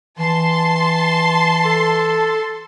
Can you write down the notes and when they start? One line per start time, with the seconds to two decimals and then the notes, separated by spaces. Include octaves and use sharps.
0.19 E3 A5 C6
1.65 A4